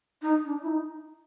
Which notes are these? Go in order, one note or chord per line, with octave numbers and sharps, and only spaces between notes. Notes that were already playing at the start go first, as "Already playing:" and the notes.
D#4
D4
E4
D#4